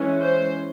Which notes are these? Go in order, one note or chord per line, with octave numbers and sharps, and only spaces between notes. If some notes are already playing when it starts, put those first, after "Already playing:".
Already playing: E3 G#3 C#4
C5